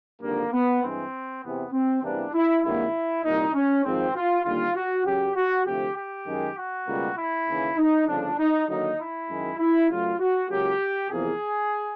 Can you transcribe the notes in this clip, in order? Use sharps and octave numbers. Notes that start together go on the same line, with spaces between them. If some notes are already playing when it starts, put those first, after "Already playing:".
G#1 G2 D3 F3 A#3
B3
G2 E3 G#3 C4
E2 C3 E3 B3
C4
E2 C3 E3 G3 A#3 D4
E4
G#1 G2 D#3 F#3 A#3 E4
C2 A#2 G3 A#3 D#4
C#4
G#1 G#2 F3 C4
F4
D#2 D3 G3 A#3 F4
F#4
F#2 C#3 F#3 G4
F#4
D2 C3 F3 A3 G4
G4
F#2 D#3 G#3
F#4
C#2 B2 G3 A#3
E4
D#2 C#3 E3
D#4
G1 F2 C#3 F3 D4
D#4
D#2 D3 F#3 A#3 D#4
E4
F#2 D#3 G#3
E4
F#2 C#3 F#3 A3 F4
F#4
C#2 C#3 F#3 A#3 G4
E2 C3 F3 A#3 G#4